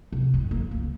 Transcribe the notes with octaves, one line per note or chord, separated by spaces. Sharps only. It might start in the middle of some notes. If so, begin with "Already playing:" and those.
C3
G2
A#3
C#2